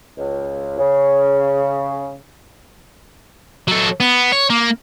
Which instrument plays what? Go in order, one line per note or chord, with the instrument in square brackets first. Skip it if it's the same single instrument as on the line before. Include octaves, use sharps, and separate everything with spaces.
[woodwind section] C#2
C#3
[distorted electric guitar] F#3 A4
B3
C#5
A#3